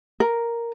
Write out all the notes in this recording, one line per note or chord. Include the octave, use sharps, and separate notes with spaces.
A#4